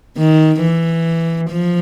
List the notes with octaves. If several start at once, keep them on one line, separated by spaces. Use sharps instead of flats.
D#3
E3
F3